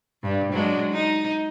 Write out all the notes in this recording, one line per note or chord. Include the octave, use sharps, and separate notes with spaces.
G2
F#3 G#3 D4
D#4